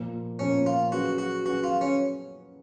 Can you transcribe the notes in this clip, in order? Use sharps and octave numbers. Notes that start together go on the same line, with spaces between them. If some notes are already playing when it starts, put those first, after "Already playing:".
Already playing: A#2 F3 A#3
A#2 F3 A#3 C#4
F4
F#3 C#4 F#4 G#4 B4
F#4
F#3 C#4 F#4 G#4 B4
F4
C#4